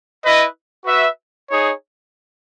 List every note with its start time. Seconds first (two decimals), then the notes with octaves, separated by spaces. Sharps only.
0.23 E4 B4 D#5
0.85 F#4 B4 E5
1.48 D#4 G#4 C#5